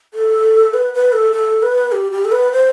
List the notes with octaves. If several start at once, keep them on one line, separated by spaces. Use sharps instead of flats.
A4
B4
B4
A4
A4
B4
G4
G4
A4
B4
C5